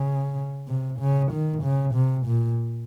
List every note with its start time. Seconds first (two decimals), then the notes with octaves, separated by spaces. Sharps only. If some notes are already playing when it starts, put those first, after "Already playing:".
Already playing: C#3
0.68 C3
1.00 C#3
1.32 D#3
1.63 C#3
1.94 C3
2.27 A#2